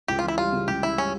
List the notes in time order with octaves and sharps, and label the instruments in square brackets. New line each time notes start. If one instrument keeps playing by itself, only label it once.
[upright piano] C#2 [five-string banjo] G4
[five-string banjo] F4
[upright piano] E3 [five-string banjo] E4
[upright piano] G3 [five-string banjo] F4
[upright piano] C#3
[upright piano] C#2 [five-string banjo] G4
[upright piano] E3 [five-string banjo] E4
[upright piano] G3 [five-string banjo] C#4